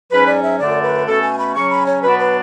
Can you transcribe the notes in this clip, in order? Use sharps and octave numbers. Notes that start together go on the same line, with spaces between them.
G#2 F#3 C#4 B4
D5
E5
F#2 D3 A3 D4 D5
B4
B2 A3 C#4 A4
G#5
B5
C#3 F#3 C#4 C#6
B5
C#5
B2 F#3 B3 D4 B4
B4